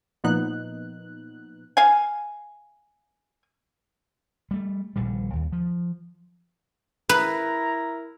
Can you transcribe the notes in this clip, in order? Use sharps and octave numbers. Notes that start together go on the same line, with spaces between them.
A#2 F3 B3 D#4 F#6
F5 G#5
G3 A3
D#1 A#1 D3 G3
D#2
F3
E4 A#4 B4 A#5